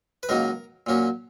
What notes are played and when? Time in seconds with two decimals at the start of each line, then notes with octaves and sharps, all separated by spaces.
0.23 B4
0.29 C#2 C#3 F#3 A#3 D#4 A#4
0.86 A#2 F#3 A#3 C#4